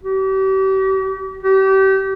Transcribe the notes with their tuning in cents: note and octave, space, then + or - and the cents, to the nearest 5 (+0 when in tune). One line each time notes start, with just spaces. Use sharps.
G4 -40
G4 -30